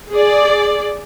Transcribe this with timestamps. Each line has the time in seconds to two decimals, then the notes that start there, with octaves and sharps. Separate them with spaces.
0.12 G#4 D5